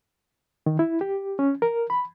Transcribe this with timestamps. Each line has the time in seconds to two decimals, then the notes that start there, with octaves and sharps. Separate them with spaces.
0.66 D#3
0.79 E4
1.01 G4
1.39 C#4
1.62 A#4
1.90 B5